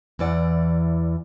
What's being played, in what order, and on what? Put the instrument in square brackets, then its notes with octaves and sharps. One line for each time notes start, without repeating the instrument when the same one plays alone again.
[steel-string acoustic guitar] E2 E3 D5 F#5